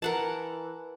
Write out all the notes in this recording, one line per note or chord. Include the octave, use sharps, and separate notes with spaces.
E3 A#4 F#5 A5